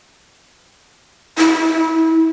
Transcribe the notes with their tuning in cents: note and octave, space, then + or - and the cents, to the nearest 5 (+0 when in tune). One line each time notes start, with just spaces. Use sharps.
E4 -30